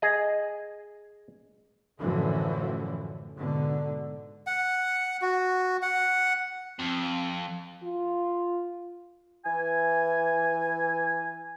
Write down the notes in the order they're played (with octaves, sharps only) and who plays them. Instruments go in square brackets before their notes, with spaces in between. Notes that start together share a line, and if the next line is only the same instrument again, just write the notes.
[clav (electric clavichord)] G#4 D#5
[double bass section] F#2 A2 D3 E3 F3
G#2 B2 D3
[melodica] F#5
F#4
F#5
[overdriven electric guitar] F2
[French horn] F4
[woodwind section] E3 G#5